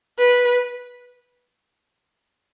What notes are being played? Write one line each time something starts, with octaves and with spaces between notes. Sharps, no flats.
B4